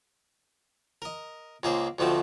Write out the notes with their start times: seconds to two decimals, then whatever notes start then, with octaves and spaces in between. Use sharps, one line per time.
1.02 A#4 D#5
1.63 C#2 A#3 G#4 C5
1.99 D2 B2 F3 A3 C4